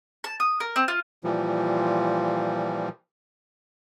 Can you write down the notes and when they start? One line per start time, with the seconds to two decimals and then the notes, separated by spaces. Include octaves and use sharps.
0.24 A5
0.40 D#6
0.60 A#4
0.76 C4
0.88 F4
1.24 A#2 E3 F3 G3